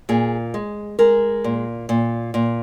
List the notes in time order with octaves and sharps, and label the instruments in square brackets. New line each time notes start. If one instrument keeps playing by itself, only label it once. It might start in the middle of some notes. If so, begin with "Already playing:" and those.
[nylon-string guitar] A#2 G#4
G#3
G#3 A#4
A#2
A#2
A#2